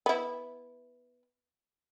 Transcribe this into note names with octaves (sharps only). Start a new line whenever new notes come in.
B3 E4